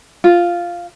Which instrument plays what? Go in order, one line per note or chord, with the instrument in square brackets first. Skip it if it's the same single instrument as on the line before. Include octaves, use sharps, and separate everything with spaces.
[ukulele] F4